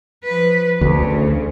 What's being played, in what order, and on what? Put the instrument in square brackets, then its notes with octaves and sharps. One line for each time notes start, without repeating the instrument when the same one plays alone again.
[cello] F3 B4
[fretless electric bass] D2 [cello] C#3 E3